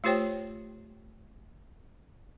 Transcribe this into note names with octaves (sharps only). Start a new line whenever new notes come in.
A3 F4 G4 C5 C#5 G5